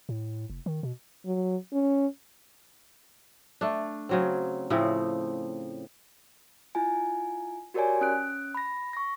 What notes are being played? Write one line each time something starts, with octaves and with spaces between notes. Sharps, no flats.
A2
F1
D#3
B2
F#3
C#4
A3 D4
C#3 F#3 C4
A2 C#3 F3 C4
E4 F4 G#5
F#4 G4 A#4 C#5 D5 G#5
C#4 F#6 D7
B5 A#6
C#6 A#6